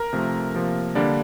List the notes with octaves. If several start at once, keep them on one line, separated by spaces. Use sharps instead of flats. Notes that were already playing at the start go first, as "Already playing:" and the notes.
Already playing: A#4 A#5
C3 F3 A3
C3 F3 A#3
D3 G3 A#3 D4 D5